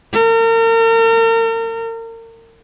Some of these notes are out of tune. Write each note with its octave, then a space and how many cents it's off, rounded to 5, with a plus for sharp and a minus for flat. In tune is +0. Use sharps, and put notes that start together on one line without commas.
A#4 -40